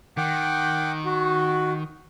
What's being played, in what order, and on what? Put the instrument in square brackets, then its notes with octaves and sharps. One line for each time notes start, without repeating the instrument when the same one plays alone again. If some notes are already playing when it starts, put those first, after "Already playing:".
[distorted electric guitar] D#3 [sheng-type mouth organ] F#5 G5 D6
[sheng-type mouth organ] F#4